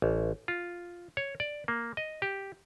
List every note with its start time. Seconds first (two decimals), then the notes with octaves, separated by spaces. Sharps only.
0.02 A1
0.48 F4
1.17 C#5
1.40 D5
1.68 A#3
1.97 D#5
2.22 G4